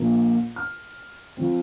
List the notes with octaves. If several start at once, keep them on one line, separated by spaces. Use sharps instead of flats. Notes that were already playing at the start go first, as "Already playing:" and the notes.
Already playing: A#1 A#2 A#3
F6
F3 C4